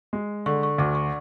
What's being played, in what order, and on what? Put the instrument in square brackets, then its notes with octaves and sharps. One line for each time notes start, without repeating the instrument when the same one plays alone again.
[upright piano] G#3
[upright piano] D3 [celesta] C#6
[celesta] C#6
[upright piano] D2 [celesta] D6
[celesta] C#6